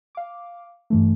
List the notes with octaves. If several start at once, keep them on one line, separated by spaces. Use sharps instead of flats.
F5 D6
G2 E3 A3